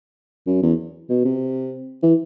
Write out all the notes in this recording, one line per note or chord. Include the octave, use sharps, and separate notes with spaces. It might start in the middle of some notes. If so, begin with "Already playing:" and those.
F#2
E2
B2
C3
E3